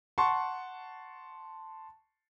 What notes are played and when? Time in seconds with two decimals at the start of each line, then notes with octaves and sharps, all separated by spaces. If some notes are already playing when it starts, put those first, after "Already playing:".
0.18 F#5 A5 C6 C#6